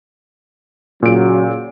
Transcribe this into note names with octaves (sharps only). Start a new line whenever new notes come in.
A#2 C#3 F#3 D7